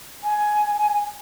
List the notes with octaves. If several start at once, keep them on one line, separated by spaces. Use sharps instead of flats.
G#5